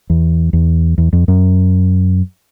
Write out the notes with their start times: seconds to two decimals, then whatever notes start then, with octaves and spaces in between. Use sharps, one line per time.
0.10 E2
0.53 E2
0.98 E2
1.13 F2
1.28 F#2